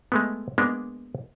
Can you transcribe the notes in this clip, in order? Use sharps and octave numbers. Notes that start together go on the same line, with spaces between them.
G#3 A3 B3
G#3 A#3 B3 D4